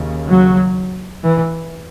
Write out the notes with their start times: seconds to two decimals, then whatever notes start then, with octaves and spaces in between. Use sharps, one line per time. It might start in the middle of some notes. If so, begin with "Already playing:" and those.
Already playing: D#2 C#3
0.27 F#3
1.24 E3